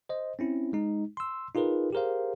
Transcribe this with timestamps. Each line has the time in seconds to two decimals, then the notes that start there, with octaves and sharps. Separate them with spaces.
0.09 C5 D#5
0.39 C4 C#4 E4
0.73 G#3 D#4
1.17 C6 E6
1.55 D#4 F4 G#4 A#4 B4
1.93 G4 G#4 A#4 C5 F5